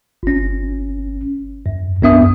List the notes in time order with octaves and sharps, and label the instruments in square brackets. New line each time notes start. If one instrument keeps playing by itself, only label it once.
[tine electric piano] G1 C#4
F#2
C2 F#2 B3 D4 E5 D#6